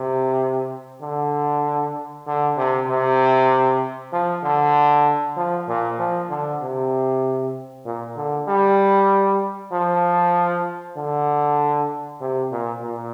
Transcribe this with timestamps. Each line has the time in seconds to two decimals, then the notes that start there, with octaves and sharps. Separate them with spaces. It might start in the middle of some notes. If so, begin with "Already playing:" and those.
Already playing: C3
1.02 D3
2.27 D3
2.57 C3
2.88 C3
4.12 F3
4.44 D3
5.37 F3
5.68 A#2
5.99 F3
6.30 D3
6.61 C3
7.85 A#2
8.16 D3
8.48 G3
9.72 F3
10.97 D3
12.21 C3
12.52 A#2
12.83 A#2